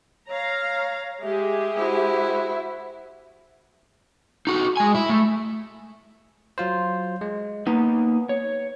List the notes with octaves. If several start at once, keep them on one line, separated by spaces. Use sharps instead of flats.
C#5 F5 A#5
G#3 G4 G#4 E5
E4 F#4 C5
D#4 F#4
G#3 G#5
E4
A3
F#3 F4 C5
G#3
A#3 B3 D#4
C#5